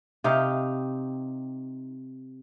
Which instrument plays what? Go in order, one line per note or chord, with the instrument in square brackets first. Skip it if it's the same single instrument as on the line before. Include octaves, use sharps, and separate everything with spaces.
[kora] C3 D#4 G4 F5